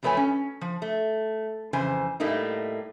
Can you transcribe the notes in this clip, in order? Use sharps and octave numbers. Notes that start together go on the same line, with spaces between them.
F2 F#3 A3 B4 C#5 G#5
C#4
F3
A3
F2 C#3 E3 C5 G#5
A2 G3 A3 A#3 D#4